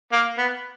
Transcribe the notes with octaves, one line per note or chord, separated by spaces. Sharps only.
A#3
B3